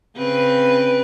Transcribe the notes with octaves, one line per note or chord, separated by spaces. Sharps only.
C#3 C4 B4